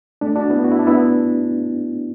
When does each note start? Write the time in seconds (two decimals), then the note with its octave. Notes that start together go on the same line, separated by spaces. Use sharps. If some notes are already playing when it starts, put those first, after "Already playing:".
0.21 A3 D4
0.36 D4 F#4
0.50 B3 E4
0.64 F#4
0.72 E4
0.79 D4
0.87 B3 E4